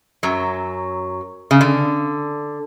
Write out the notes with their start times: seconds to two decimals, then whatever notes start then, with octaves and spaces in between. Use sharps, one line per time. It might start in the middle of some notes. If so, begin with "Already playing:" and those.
0.23 F#2 F#3
1.51 C#3
1.61 D3